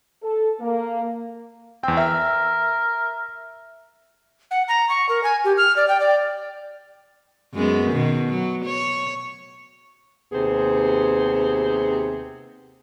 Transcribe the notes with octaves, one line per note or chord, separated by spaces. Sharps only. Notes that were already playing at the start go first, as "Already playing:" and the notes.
A4
A#3
E2 C4 G5
A#4 E5
F#5
A#5
C#6
A#4
G#5
G4
F6
D5
G5
D5
F#2 G#3 B3
B2 D#3
F#3
C#5
D#2 C3 B3 G#4 C5